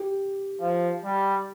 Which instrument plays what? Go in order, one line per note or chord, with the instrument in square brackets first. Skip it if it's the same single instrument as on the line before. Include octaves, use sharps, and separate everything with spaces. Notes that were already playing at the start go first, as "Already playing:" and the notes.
Already playing: [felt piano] G4
[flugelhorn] F3
G3